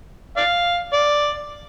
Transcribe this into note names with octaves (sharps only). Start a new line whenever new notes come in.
D5 F5
D5